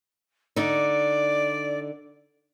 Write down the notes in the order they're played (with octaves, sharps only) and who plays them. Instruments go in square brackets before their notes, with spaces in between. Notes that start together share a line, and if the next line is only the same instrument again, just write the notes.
[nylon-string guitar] D3 D#4 [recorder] D5